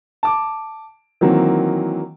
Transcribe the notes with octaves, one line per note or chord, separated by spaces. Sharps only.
A5 D6
D#3 E3 F#3 A#3 C4